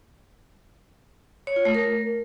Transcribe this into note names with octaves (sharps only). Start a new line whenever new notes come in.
C#5
F4
A3
A#4